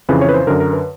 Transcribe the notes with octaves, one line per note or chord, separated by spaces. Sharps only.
F2 C#3 E3 B4
C#5
B4
C5
F#2 D3 A#4
A#4
B4